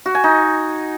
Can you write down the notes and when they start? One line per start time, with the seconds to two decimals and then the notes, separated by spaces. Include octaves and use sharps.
0.06 F#4
0.15 G#5
0.24 D#4